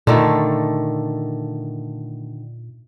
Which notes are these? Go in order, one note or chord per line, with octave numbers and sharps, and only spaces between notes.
A#2 D3 D#3 A3